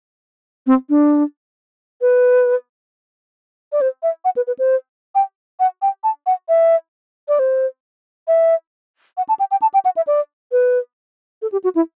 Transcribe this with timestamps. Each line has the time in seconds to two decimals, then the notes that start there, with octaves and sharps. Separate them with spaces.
0.67 C4
0.89 D4
2.01 B4
3.72 D5
3.81 C5
4.03 E5
4.25 F#5
4.36 B4
4.47 B4
4.59 C5
5.15 G5
5.60 F#5
5.82 G5
6.04 A5
6.27 F#5
6.49 E5
7.28 D5
7.39 C5
8.28 E5
9.17 F#5
9.29 A5
9.39 G5
9.51 G5
9.62 A5
9.74 G5
9.85 F#5
9.96 E5
10.07 D5
10.52 B4
11.42 A4
11.52 G4
11.64 F#4
11.75 E4